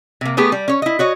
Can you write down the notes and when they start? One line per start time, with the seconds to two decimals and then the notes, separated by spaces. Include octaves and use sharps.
0.21 C3 A#3
0.37 A3 B3 G4 G#4
0.52 G3
0.68 C#4 C#5
0.82 E4 D#5
0.99 F#4 C#5 D#5